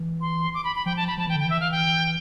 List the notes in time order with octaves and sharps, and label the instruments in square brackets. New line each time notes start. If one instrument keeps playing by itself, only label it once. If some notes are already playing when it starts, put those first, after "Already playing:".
Already playing: [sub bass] E3
[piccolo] C6
D6
B5
B5
[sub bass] F3 [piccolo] G5
[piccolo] A5
B5
[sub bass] F3 [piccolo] A5
[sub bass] E3 [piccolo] G5
[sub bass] D3
[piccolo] G5
[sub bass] E3
[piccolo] E5
F5
G5